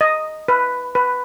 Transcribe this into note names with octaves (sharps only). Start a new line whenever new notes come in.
D#5
B4
B4